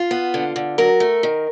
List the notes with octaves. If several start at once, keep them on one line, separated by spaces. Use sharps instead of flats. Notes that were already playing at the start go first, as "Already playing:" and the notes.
Already playing: F4
B3
D3
D3
F#3 A#4
A3
D#3